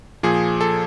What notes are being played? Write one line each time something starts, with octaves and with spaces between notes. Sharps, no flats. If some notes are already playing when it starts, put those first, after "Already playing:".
A#2 F3 G#4
A4